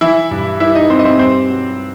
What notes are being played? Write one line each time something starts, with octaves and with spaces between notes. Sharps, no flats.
E3 E4 E5
G2
G3 E4 E5
D#4 D#5
G3 C4 C5
D#5
C4 C5
G2 C4 C5
F#3